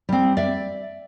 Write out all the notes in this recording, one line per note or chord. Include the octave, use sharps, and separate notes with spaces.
G3 C4
D5 E5